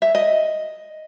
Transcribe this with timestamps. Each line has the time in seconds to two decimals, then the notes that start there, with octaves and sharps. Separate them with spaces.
0.02 E5
0.15 D#5